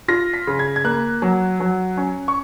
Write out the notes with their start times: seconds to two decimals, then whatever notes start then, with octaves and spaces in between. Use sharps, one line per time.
0.08 F4 A#6
0.34 B6
0.47 C#3
0.59 G#6
0.76 G#6
0.84 A#3 F#6
1.22 F#3
1.60 F#3
1.97 C#4
2.28 C#6